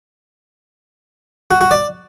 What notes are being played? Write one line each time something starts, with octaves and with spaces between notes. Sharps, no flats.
F#4
F#4
D5